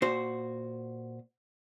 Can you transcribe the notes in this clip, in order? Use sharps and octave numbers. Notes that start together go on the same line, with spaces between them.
A#2 F#4 C5